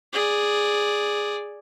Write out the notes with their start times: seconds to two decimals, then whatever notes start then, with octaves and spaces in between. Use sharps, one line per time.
0.13 G#4 D5